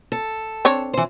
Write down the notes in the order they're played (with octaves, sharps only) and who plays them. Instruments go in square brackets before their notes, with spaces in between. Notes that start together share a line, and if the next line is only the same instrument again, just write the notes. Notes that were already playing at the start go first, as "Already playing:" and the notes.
[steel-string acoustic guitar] A4
[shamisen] C4 D4 C#5
[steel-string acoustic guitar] E3 C5